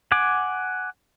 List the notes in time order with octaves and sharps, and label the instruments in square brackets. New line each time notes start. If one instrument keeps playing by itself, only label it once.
[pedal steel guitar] F#5 G#5 D6